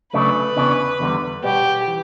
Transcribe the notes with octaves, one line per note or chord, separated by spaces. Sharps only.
C#3 F#3 A3 D4 B4
E2 C#3 E3 B3 D4
E2 D3 G3 B3
B2 G3 B3 G4
E3